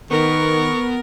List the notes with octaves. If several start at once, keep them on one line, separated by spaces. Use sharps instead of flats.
D#3 B3 A#4 C#6